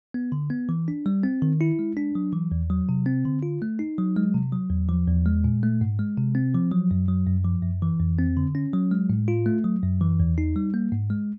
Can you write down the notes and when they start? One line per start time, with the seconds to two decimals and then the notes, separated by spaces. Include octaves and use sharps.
0.14 B3
0.32 D3
0.50 B3
0.69 E3
0.88 D4
1.06 G3
1.23 C4
1.42 D#3
1.61 E4
1.79 G#3
1.97 D4
2.15 F#3
2.33 E3
2.52 E2
2.70 F#3
2.89 C3
3.06 C4
3.25 D3
3.43 F4
3.62 A3
3.79 D#4
3.98 F#3
4.16 G#3
4.34 C3
4.52 F#3
4.70 E2
4.89 F3
5.08 E2
5.26 G#3
5.44 A#2
5.63 A3
5.81 G#2
5.99 G#3
6.18 C3
6.35 C4
6.54 F3
6.72 F#3
6.91 F#2
7.09 F#3
7.27 F#2
7.45 F3
7.63 F#2
7.82 E3
8.00 F2
8.19 C4
8.37 D3
8.55 C#4
8.73 F#3
8.91 G#3
9.10 A2
9.28 F4
9.46 A3
9.64 F#3
9.83 F#2
10.01 E3
10.20 E2
10.38 D#4
10.56 G3
10.74 A#3
10.92 G#2
11.10 G#3